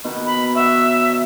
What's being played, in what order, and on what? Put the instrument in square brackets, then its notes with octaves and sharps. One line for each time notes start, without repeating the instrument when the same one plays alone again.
[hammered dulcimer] B2 D#3 B3
[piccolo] B5
[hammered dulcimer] C#5 F#5 [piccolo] E5